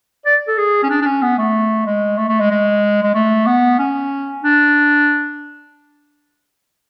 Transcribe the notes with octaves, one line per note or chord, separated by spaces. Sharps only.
D5
A4
G#4
C#4
D4
D4
C#4
B3
A3
G#3
A3
A3
G#3
G#3
G#3
A3
B3
C#4
D4